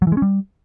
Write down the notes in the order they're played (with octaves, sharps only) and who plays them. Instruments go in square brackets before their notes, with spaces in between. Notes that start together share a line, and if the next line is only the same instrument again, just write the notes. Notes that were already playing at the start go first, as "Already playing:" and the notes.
[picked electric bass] F#3
E3
G#3
C#4
G3